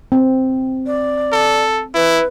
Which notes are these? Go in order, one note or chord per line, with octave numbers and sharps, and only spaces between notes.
C4
D5
A4
E4 B4